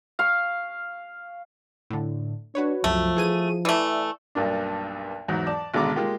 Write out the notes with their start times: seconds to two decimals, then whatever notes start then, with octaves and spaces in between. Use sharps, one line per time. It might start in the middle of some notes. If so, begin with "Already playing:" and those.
0.19 F5 C#6
1.90 A2 D3
2.55 D4 F#4 B4 C#5
2.84 C2 F#2 F3 F#3 A3
3.17 E3 G#4 D#7
3.65 E3 A3 D5 E5 E6
4.35 B1 G2 A#3 D4
5.28 E2 G#2 F#3
5.47 D5 A5
5.74 G#1 B2 D3 G#3 A#5 D6
5.96 G#3 A#3 F4 G4